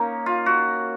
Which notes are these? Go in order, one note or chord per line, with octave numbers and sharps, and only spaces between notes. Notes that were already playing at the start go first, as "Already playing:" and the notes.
Already playing: A#3 C#4 D#4
F4
F#4